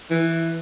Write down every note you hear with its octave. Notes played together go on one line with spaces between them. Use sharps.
E3